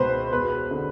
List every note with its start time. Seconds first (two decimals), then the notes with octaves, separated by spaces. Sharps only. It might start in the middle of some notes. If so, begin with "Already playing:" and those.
Already playing: C#2 B2 B4 C5
0.32 E1 B4
0.71 D3